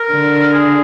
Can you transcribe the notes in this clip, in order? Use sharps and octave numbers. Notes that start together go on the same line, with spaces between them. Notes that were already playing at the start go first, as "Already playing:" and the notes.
Already playing: A#4
D3
G#4